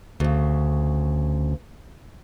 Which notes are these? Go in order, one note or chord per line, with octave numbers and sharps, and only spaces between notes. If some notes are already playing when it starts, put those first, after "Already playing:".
D2 C#3